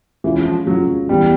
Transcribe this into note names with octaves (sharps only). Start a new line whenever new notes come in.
E3 G#3 C#4 F4
F3
F#3 G#3 C#4 F4
E3 G3 G#3 B3